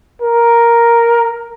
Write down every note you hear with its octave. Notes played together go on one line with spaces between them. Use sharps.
A#4